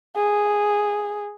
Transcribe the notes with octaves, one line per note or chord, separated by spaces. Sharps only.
G#4